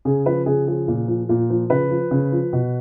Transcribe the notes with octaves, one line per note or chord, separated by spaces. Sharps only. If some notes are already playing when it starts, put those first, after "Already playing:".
C#3 G#4
F3 B4
C#3 G#4
F3 G#4
A#2
F3
A#2
F3
C#3 B4
F3
C#3
F3
B2